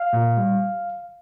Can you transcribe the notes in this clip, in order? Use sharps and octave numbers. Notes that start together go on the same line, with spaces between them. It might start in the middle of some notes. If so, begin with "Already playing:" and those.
Already playing: F5
A#2
G3